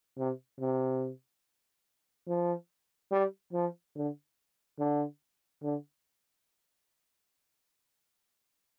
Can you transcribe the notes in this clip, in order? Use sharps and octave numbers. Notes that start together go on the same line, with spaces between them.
C3
C3
F3
G3
F3
D3
D3
D3